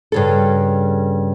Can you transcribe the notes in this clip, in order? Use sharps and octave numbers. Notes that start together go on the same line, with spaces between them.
G2 C#3 A4